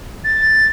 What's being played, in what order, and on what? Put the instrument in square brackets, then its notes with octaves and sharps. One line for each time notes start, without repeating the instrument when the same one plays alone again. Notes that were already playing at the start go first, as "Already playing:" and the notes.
[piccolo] A6